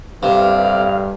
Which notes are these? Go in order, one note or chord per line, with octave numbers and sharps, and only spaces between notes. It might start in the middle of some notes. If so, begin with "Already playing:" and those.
G2 C3 A4 B4 F5